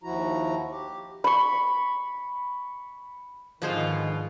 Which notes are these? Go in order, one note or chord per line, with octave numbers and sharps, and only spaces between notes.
D#2 F3 E4 F#4 A#5
G4
B5 C#6
G#2 B2 D3 D#3 F3 F4 G#4 C5